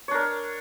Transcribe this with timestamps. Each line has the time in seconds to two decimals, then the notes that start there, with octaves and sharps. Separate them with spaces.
0.08 C#5
0.11 D4
0.14 A#4